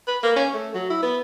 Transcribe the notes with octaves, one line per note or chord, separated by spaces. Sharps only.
B4
A#3
C#4
A3
F#3
E4
B3